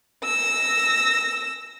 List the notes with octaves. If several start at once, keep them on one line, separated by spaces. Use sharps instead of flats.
E6 A#6